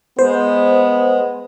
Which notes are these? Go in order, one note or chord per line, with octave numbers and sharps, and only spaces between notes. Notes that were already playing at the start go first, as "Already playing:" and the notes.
G#3 B3 C5